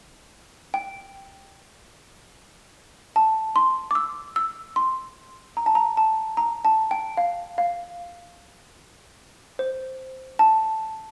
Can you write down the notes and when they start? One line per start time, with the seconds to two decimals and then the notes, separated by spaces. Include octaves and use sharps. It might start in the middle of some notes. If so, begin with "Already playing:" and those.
0.74 G5
3.16 A5
3.56 C6
3.91 D6
3.95 E6
4.36 E6
4.76 C6
5.57 A#5
5.66 A5
5.75 A#5
5.97 A5
6.37 A#5
6.65 A5
6.91 G5
7.17 F5
7.58 F5
9.59 C5
10.39 A5